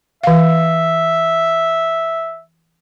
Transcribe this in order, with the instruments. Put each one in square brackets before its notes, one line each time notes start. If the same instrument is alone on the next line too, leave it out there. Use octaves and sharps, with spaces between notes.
[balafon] E3 F5 [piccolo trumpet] E5